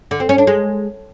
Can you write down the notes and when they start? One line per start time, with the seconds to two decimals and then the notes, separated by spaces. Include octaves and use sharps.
0.11 D3
0.20 C4
0.29 C#4
0.38 D4
0.47 G#3